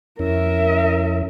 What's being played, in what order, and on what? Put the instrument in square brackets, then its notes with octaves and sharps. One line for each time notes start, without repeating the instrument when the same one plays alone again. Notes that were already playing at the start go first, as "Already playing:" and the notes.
[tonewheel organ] F2 C#4 E4 [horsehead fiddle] A#4 E5